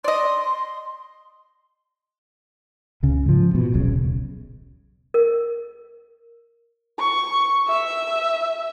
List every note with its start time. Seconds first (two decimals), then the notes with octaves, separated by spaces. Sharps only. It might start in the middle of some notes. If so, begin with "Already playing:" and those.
0.04 D5 D#5 C6
3.03 C#2 C#3
3.25 G#2 F3
3.55 B2
3.73 D#1 B1 C#3
5.14 A#4
6.99 C#6
7.68 E5